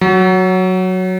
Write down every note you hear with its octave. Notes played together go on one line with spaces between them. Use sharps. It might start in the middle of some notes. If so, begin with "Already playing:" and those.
F#3